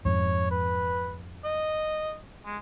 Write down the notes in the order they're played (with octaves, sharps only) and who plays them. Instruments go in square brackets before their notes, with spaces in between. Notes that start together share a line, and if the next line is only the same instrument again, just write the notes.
[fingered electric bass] F2 G#2 [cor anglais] C#5
[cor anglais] B4
D#5
G#3